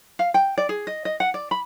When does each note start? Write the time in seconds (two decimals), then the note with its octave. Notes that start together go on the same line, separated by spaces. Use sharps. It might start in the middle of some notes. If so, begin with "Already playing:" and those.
0.19 F5
0.34 G5
0.58 D5
0.69 G#4
0.87 D#5
1.05 D#5
1.20 F#5
1.34 D5
1.51 B5